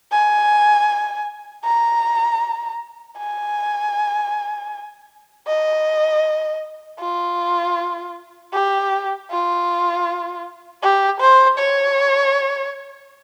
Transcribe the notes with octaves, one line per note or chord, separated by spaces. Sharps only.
G#5
A#5
G#5
D#5
F4
G4
F4
G4
C5
C#5